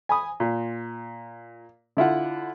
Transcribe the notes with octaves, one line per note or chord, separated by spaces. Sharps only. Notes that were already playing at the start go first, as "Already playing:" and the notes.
G#5 B5 D#6
A#2
D3 E4 F4 F#5